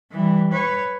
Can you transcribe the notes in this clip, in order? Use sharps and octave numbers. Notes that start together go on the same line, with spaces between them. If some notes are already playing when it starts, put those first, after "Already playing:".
E3 G3
B4 C#5